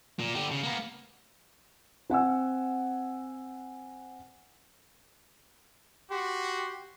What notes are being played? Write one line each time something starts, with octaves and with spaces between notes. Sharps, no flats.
A#2
D3 G4
C#3
A#3 B3
C4 F#5 G#5 E6
F#4 G4 C6